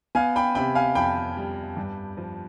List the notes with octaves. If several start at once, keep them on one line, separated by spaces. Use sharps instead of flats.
B3 F5 G#5
G5 B5
C3 G5 B5
F5 G#5
F2 G5 B5
G3
G2
F3